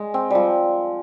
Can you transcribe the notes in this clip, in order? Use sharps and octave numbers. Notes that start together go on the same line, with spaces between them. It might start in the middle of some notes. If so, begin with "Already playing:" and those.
Already playing: G#3
C4
F3 G3